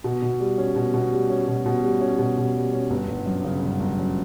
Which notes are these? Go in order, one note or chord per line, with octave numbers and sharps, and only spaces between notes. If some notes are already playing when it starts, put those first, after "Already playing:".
B2
B2
G3
C#4
B2
B2
G3
C#4
B2
B2
G3
C#4
B2
B2
G3
C#4
G1
G1
F#2
C#3
G1
G1
F#2